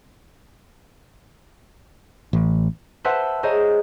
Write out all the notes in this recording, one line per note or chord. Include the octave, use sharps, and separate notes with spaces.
A1
B4 C5 E5 F#5 A5 C6
G#4 C5 C#5 D#5 A#5